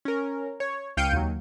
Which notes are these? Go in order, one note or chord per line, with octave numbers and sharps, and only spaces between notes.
C#4 A#4
C#5
C#2 F5 G5 G6 C#7 D#7
D#2 F#3